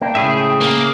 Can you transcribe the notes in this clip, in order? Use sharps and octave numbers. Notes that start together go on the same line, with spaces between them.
A#3 D4 G5
A2 C#3 G#3 G#4 E5
A#3